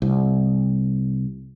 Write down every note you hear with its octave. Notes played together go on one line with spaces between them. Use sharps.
C2